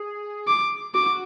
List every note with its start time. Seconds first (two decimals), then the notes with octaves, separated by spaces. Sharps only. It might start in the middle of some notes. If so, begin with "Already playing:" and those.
Already playing: G#4
0.47 D6
0.95 F#4 D6